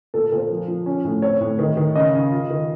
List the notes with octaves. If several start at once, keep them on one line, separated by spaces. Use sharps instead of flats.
A#2 A4
A#4
A#2
C5
F3
F3
C#4
A2
C4 C#5
A2
D#3
D#3
C#3 D#5
C#3
F4
D#3